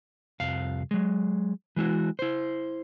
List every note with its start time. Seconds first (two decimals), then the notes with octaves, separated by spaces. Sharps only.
0.40 C2 F2 F5
0.91 F#3 G#3
1.76 E3 G#3 E4 F#4
2.19 E4 C5